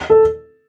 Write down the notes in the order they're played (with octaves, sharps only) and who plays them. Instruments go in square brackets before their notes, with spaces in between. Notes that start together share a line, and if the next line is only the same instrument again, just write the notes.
[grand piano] A4